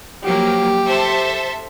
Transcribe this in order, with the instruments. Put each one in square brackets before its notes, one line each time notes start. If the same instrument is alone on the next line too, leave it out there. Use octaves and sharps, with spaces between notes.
[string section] F3 F#3 A#3 [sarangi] G4
[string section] A4 C5 E5